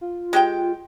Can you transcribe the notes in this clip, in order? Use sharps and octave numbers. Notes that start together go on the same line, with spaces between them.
F4
G#3 G4 G5